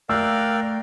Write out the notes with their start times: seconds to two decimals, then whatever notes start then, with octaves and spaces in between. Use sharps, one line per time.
0.09 A3 A#4 D5 F5 G5 E6 F#6